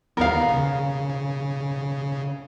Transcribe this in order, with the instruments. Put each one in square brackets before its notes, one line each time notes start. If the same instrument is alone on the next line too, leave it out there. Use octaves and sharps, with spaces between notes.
[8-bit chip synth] D#2 B3 [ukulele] A#4 F5
[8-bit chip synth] C#3